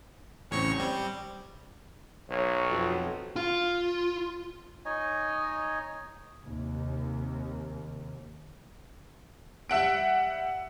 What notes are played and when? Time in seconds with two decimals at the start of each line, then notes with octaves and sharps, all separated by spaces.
0.51 A1 E2 C#3 C4 C#5 C#6
0.80 G3 C4
2.30 B1 C#5
2.70 F2 F#4
3.36 F4
4.85 D#4 C#5 D#5 G#5
6.45 D#2 C3
9.70 G3 E5 F#5 D7